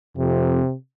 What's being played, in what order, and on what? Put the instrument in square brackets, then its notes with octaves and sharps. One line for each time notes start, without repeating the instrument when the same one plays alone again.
[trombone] F2 [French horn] C3